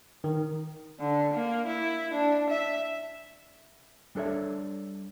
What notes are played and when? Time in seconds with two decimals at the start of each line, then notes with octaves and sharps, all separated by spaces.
0.24 D#3
1.00 D3
1.34 A#3
1.66 E4
2.13 D4
2.50 E5
4.15 G3 D4 A4 C#5 E5